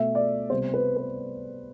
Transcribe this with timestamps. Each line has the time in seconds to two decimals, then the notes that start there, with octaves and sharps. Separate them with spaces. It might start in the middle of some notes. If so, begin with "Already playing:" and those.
Already playing: B2 A3 E5
0.15 D5
0.50 C3 G3 B3 C5
0.74 B4
0.96 B4